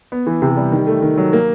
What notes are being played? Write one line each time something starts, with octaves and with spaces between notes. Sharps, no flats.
B3
E3
C3
G3
D#3
A3
D#3
F#3
A#3